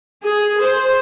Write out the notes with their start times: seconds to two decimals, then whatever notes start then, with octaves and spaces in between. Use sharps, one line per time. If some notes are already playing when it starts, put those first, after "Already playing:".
0.22 G#4
0.61 C5